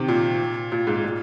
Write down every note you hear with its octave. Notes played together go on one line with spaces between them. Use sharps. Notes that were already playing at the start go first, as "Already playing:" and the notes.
Already playing: C3 D#3
A#2
A#2
G#2
A#2